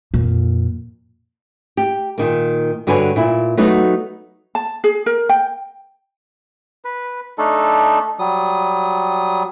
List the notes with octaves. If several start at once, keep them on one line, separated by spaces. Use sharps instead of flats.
F2 A#2
G4
A#2 D#3 A#3
G2 D3 F#4 B4 C#5 G#5
A#2 E4
F#3 A3 B3 D#4 F#4
A5
G#4
A#4
G5
B4
A3 D4 D#4 A4
F#3 G3 D#6